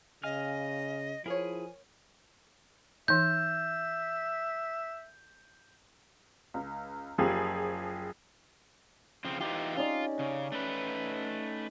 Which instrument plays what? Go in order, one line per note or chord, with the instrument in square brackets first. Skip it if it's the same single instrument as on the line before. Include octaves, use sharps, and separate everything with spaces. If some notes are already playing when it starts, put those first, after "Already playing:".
[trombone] C#3 [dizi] D#5 [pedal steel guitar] F5 G#5 F6
[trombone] F3 [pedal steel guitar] E4 G#4 [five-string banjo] A#4 C#5 [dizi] G#5
[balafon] E3 D#4 [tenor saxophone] E5 [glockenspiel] G6
[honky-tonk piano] C#2
F#1 F3 G4 G#4
[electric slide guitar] C#3 F3 C4
[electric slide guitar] E3 D#4 F4 [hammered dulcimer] G4
[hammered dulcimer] C#4 D#4 D5 [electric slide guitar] F4
[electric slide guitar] C#3
A3 B4